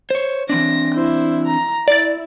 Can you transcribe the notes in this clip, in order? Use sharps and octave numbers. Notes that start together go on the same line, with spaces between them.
C5 C#5
E3 C4 D4 A#6
E4 C5
A#5
E4 D5 A6